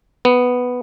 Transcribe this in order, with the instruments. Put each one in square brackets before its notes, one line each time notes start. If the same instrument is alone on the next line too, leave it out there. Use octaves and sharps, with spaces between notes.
[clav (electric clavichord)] B3